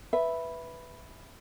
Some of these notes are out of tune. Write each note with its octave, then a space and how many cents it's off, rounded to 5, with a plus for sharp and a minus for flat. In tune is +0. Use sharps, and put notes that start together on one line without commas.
B4 +0 E5 +0